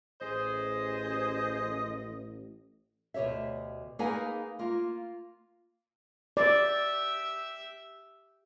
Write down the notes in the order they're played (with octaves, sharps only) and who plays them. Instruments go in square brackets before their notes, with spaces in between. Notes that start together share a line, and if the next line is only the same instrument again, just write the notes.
[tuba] A1 [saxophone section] G#4 C5 [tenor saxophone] D#5
[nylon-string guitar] D2 B2 G4 C#5 E5
A#3 D#4 G#4 B4 F#5 G#5
A#3 F4
[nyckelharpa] G4 E5 [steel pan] D5